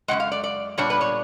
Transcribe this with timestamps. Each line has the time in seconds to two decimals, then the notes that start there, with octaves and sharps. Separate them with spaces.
0.08 F#2 D#3 G#3 F#5
0.20 F5
0.32 D5
0.44 D5
0.78 A#2 G3 B3 D4 C#5
0.90 B4
1.01 C#5